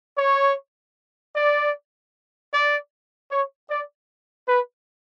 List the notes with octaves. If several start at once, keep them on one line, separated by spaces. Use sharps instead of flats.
C#5
D5
D5
C#5
D5
B4